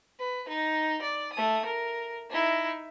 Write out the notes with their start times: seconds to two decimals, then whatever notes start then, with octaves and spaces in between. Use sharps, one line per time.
0.19 B4
0.48 D#4
1.02 D5
1.33 A3 D#6
1.65 A#4
2.29 D#4 E4